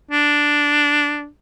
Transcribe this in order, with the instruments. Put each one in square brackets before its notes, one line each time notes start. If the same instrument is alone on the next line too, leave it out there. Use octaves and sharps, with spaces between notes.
[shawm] D4